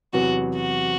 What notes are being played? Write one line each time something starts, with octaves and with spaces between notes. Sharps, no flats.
E2 C3 F#3 B3 F#4
F#4